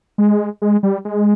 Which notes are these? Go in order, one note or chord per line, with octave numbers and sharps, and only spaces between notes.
G#3
G#3
G3
G#3